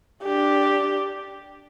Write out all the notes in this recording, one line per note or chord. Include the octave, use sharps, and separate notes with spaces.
D4 G4